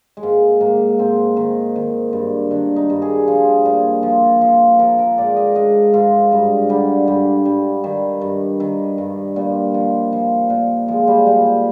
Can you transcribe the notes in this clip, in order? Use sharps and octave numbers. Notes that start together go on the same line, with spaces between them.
G#3
G#2 A#3
G#2 A#3
G#2 C4
D#3
D#3
G2
D#3 D4
D#4
G2
G#4
F3
A#2
F3
F3
F3 A#4
A#4
G#2 D5
D#5
G#2 D#5
G#2 F4
G2 G3
D3 G3
G2 G3
G2 G3
D#3 G3
G2
D#3
G2
A#2 G3
F3
F3
A#2
F3 G#3
G3
A#2 G3
G3